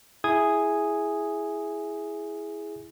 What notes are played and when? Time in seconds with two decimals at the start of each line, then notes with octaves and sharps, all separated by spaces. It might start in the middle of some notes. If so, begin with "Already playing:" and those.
0.24 E4 G#4 D#6 G#6